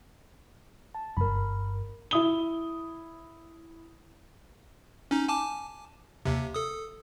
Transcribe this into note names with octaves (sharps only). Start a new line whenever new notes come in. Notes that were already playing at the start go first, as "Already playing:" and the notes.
A5
G1 A#4 B5
E4 D#6 G7
C#4 D#4
G#5 A5 D6
D#2 C3
A4 D#6